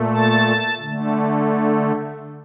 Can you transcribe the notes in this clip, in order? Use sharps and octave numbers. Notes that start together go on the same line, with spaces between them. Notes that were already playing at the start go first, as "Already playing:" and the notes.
Already playing: A#2 A3
A5
D3 A3